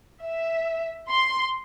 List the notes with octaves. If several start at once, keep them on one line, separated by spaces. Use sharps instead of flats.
E5
C6